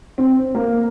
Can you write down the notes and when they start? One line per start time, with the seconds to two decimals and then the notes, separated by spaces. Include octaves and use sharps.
0.18 C4
0.55 A#3